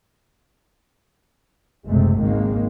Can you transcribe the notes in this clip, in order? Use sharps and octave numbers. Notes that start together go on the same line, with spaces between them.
F#1 C#2 C3 G#3 A3
G#1 D#3 G#3 A#3